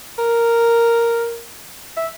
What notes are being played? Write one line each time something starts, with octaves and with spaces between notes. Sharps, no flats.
A#4
E5